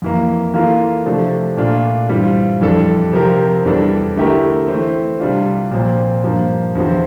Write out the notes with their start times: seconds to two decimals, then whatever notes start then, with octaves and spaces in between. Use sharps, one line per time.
0.02 F2 E3 A#3
0.54 E3 A#3 F4 A4
1.06 C3 F3 A3 D4 A4
1.57 A#2 A3 D4 F4
2.09 G2 E3 G3 C4 F4
2.61 F2 E3 G3 D4 A4
3.13 C3 F3 C4 G4 A#4
3.65 E2 E3 G3 D4 A4
4.16 D3 A3 E4 G4 A#4
4.68 E3 A3 C4
5.20 C3 G3 D4 F4
5.71 A#2 F3 C4
6.24 G2 F3 A#3
6.75 E2 D3 F3 C4